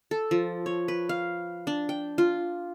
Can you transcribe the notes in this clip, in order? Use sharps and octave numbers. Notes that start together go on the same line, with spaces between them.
A4
F3
C#5
B4
F5
D4
G5
F4